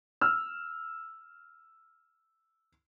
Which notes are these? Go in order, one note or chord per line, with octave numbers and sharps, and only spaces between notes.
E6 F6